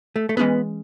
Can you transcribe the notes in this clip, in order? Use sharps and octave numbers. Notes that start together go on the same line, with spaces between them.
A3
A3
E3 G#3 B3 C#4 G#4